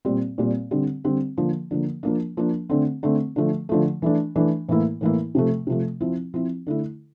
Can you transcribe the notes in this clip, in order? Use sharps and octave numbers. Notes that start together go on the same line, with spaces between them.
A#2 G3 C4
A#2 G3 C4
D3 G3 C4
D3 G3 C4
D3 F3 A#3
D3 F3 A#3
F3 A#3 D4
F3 A#3 D4
D3 A3 C4
D3 A3 C4
D3 F3 A3
D3 F3 A3
E3 A3 D4
E3 A3 D4
A2 E3 A#3 E4
A2 E3 A#3 E4
C3 F3 A3
C3 F3 A3
F3 C4 E4
F3 C4 E4
D3 A3 E4